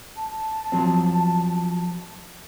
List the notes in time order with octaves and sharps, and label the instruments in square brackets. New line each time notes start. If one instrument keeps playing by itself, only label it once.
[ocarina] A5
[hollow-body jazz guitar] F3 F#3 C4